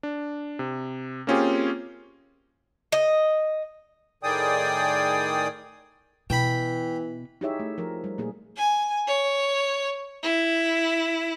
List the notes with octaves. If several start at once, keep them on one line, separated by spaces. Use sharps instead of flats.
D4
C3
A#3 C4 C#4 F4 G4 G#4
D#5
A2 D#3 G#4 D5 G5 D#6
B2 E3 G5 B5
D#4 E4 G4 G#4 C#5 E5
A3
F3 A#4
G3
A#2 A3 A#3 G#4
G#5
C#5
E4